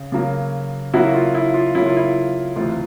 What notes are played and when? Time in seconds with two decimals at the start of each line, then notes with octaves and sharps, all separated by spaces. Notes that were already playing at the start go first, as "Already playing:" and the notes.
Already playing: C#3
0.12 C#3 F#3 A#3
0.94 C#3 F#3 A#3 E4 F#4
1.14 F4
1.35 E4
1.54 F4
1.75 C#3 F#3 A#3 E4
1.86 F4
1.97 E4
2.56 D2 C3 E3 F4